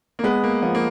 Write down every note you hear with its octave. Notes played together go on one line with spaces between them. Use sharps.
A#3
G#3 B3
A#3
F3 B3
A#3